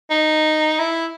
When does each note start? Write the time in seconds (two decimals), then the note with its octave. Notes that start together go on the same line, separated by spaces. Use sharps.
0.11 D#4
0.79 E4